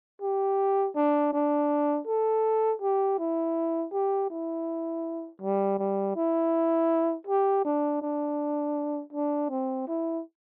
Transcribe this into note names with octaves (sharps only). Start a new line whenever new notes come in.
G4
D4
D4
A4
G4
E4
G4
E4
G3
G3
E4
G4
D4
D4
D4
C4
E4